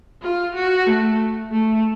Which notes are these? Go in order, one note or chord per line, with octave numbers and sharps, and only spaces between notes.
F4
F#4
A3
A3